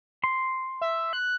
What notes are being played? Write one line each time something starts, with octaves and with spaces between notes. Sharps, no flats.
C6
E5
F#6